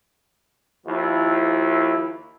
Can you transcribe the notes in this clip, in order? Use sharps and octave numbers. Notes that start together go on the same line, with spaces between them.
D#2 F3 E4